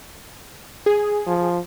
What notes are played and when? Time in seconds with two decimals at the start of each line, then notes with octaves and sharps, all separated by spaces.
0.86 G#4
1.26 F3